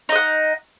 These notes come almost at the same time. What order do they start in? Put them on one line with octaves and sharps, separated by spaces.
D#4 D#5 F#5